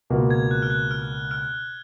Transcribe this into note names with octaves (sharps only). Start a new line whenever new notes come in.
C#2 B2 A#3 F4
G#6
F#6
F6
F#6
F6
F6